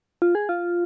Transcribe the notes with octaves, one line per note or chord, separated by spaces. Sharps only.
F4
G#4
F4